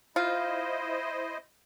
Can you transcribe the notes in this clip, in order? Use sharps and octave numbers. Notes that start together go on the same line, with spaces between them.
E4 F4 C5 D#5